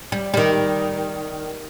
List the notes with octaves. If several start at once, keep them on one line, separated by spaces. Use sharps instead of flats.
G3
D#3 G3